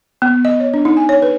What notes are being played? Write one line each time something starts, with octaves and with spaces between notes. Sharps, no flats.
B3
D#5
C#5
D4
D#4
G#5
C#5
B4